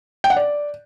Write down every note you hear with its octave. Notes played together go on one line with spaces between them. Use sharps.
G5
F#5
D5